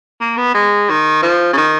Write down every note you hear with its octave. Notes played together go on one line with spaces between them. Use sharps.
A#3
B3
G#3
D#3
F3
C#3
D#3